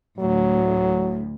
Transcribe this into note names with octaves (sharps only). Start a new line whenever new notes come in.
D2 A2 F#3